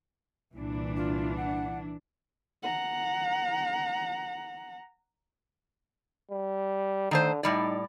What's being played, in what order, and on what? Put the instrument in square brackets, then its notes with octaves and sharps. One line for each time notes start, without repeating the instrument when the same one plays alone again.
[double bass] C2 A#2 [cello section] E3 D4
[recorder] F4
F#5
[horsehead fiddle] F#5 A#5
[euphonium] G3
[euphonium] D3 [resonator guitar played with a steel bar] D#3 A3 C5
[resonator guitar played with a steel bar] A2 G3 D5 [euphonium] D#4